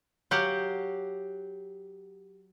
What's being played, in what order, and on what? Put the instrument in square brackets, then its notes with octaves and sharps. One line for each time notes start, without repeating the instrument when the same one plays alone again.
[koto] F#3 G4 F5 F#5